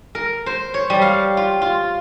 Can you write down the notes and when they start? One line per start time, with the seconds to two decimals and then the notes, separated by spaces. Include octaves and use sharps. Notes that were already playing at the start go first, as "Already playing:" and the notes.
0.15 A#4
0.46 C5
0.74 C#5
0.90 G3
1.02 F5
1.37 F4
1.62 F4